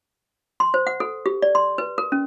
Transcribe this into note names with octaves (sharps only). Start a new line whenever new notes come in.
C6
C5
F#5
A4
G4
D5
C6
B4
A#4
C#4